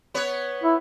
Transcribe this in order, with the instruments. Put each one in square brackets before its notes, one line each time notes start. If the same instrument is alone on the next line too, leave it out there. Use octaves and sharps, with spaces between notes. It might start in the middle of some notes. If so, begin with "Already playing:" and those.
[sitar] B3 B4 C#5
[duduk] E4